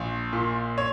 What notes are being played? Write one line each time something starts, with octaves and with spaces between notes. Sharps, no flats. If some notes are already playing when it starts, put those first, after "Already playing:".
Already playing: A#1
A#2
C#5